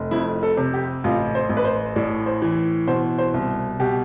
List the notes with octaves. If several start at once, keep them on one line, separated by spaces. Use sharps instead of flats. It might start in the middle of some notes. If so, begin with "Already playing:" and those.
Already playing: F1
F2 E4
A4
C3
G4
A1 F4
C5
A1
B4
C5
A2 D5
C5
E3
B2 C5
C5
C2
B2 G4